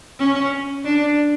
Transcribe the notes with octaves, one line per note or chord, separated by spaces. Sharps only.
C#4
D4